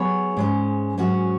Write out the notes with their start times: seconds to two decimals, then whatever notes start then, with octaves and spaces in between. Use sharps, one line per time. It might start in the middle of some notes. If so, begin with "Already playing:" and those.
Already playing: F#3 B3 G#4 C#5
0.37 G#2 G#3 C#4
0.98 G#2 F#3 C#4 F#4